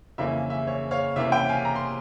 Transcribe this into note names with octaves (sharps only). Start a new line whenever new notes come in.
F2 C#3 E3 A#3 C#4 E5
E5
C#5
C#5 F5
C3 E3 A#3 C#4 E5
E5 G5
F5 G#5
A#5
C6